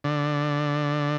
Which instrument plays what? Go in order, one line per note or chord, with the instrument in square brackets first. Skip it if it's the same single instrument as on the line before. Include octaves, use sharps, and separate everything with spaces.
[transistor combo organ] D3